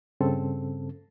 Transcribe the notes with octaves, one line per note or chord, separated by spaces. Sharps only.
G2 C#3 C4 A4